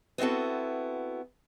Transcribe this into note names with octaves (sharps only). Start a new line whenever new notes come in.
B3 C4 E4 F#4 A4